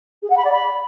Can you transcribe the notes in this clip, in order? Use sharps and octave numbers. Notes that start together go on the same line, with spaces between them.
G#4
F#5
B5
D5
B5